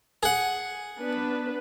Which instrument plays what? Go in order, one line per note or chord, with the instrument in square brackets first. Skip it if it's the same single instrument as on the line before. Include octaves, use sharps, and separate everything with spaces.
[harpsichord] G#4 F#5
[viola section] B3 D4 B4